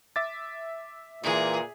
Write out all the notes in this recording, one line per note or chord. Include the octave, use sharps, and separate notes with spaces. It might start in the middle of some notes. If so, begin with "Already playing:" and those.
E5 D6 A6
A#2 E3 G#3 G#4